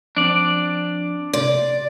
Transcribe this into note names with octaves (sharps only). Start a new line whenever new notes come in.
F3 C4 D4 D5
C3 D5 C6 D6